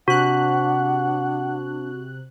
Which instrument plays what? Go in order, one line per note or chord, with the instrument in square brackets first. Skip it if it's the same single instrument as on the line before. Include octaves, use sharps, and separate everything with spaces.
[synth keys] C3 F#6 [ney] D4 [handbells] F#4 [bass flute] F#5